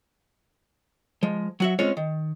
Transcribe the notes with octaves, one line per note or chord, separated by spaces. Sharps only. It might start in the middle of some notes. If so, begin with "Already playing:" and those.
F3 G#3
F#3 F#4 E5
G#3 C4 C#4 F4 C#5
D#3